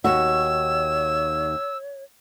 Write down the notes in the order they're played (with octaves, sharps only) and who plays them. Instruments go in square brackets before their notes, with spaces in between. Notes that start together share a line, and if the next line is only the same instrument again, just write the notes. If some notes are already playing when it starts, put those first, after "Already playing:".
[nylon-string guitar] D#2 F#4 [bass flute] C#5 [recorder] E6